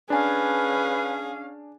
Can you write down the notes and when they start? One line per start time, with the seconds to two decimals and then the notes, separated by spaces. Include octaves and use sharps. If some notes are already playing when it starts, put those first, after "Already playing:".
0.10 C#4 D4 G#4 B4 F5 G#5